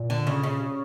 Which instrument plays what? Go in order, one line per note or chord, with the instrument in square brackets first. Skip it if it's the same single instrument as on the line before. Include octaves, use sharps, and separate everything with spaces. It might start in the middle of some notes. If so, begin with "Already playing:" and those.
Already playing: [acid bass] A#2
[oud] D3
C#3
C#3
[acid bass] C3